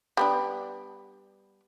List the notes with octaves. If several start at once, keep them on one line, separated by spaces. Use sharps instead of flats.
G3 B3 D4